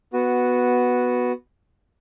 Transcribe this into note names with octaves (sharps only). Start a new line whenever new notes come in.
B3 F#4